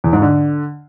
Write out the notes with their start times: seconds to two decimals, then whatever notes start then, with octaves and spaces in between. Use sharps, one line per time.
0.04 E2
0.13 G#2
0.22 D3